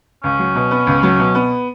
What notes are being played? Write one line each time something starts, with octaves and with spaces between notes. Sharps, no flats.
C#2 C#4
F#3
B2
B3
C#2
F#3
B2
B3